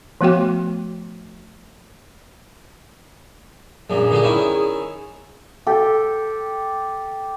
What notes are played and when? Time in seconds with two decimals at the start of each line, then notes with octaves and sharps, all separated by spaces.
0.21 F3 A3 B3 F#4 G5
3.90 A#1 F#2 G#4
4.10 A#2 D3 G4
4.22 D#3 C#4 E4
5.67 G4 A4